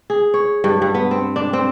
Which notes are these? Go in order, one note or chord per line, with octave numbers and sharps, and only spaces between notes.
G#4
C#5
G2
G2
B3
C4
D4
C4